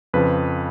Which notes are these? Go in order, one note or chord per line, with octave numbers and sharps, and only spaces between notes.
F2 C#3 F3 B4